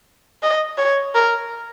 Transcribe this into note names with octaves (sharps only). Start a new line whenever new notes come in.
D#5
C#5
A#4